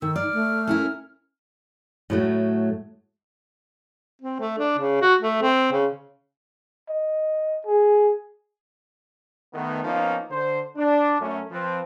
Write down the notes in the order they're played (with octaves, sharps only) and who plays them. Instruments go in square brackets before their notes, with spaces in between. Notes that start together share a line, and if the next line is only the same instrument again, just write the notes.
[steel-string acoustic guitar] D#3 [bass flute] D#4 [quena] E6
[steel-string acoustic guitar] D5 [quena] F6
[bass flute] A3
[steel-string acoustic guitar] C#4 E4 A#4
A2 F#3 A3
[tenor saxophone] C4
A3
D4
C#3
F#4
A3
C4
C#3
[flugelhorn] D#5
G#4
[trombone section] D#3 A3 B3
F3 A#3 B3 C#4 D#4 F4
D3 C5
D4
F#2 A3 C#4
F3 C4 B4